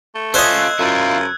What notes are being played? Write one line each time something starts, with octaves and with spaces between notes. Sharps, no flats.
A3
C#4 F4 C5 D#5 E6 F#6 G#6
E6 F#6
F#2 E4 F4